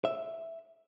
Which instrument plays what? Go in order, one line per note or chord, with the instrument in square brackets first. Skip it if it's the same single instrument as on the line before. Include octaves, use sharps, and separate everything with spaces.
[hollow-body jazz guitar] E5